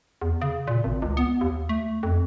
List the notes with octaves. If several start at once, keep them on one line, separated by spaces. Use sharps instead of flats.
E2
C#3
A#2
G#1
C#2
B3
D#2
A3
F2